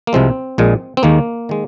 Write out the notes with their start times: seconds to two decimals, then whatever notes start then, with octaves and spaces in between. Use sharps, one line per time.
0.07 A#3
0.13 C2 C3 F3 G#3 C4
0.58 A#1 A#2 G#3
0.97 C4
1.03 D#2 D#3 G#3 A#3
1.49 D#3 G#3